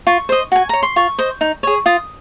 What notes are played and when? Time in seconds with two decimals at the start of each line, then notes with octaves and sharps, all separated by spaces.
0.07 F4 C#6
0.29 C5 D#5
0.52 F#4 G#5
0.69 C#5 A#5
0.83 C6
0.96 F4 C#6
1.18 C5 D#5
1.41 D#4
1.63 G#4 C#5
1.86 F4 D#6